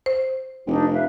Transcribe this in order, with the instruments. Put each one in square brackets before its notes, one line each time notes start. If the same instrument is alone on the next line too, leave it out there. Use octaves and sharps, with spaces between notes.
[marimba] C5
[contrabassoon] F1 [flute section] D4 D#4 G4
[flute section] B4 E5 F5